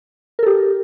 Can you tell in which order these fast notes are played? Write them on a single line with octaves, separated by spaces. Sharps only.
A#4 A4 G4